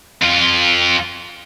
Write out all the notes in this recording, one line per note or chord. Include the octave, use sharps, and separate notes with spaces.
F2 F4